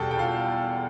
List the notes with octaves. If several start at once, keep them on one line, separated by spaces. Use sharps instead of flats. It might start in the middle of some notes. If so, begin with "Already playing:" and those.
Already playing: E2 B2 G3 A4 G5 A5
G5
F4 F5